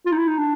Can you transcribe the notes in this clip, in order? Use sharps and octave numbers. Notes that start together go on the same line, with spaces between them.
F4
D#4
E4
D#4
D4